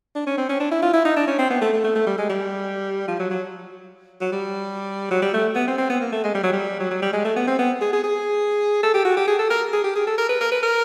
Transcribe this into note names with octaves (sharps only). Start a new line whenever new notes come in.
D4
C#4
C4
C#4
D4
E4
F4
E4
D#4
D4
C#4
C4
B3
A3
A3
A3
A3
G3
G#3
G3
F3
F#3
F#3
F#3
G3
F#3
G3
A3
B3
C4
C4
B3
A#3
A3
G#3
G3
F#3
G3
F#3
F#3
G3
G#3
A3
B3
C4
B3
G#4
G#4
G#4
A4
G4
F#4
G4
G#4
A4
A#4
G#4
G4
G#4
A4
A#4
B4
A#4
B4
A#4